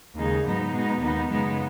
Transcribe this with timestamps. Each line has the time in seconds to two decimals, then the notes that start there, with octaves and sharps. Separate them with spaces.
0.16 D#2 C#3 G#3 D#4
0.45 G#2 F#3 B3 D#4
0.73 B2 G#3 B3 D#4
1.02 D#2 D#3 B3 D#4
1.30 F#2 C#3 G#3 B3 D#4